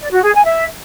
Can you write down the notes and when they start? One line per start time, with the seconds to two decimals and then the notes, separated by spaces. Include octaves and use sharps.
0.01 D5
0.12 F#4
0.23 G#4
0.34 G#5
0.45 E5